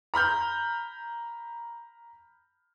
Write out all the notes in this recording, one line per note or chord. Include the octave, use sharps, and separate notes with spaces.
A#5 B5 F6 G6